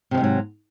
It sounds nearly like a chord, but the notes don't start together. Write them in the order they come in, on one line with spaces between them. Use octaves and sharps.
C3 F3 D#3 G#2 F#3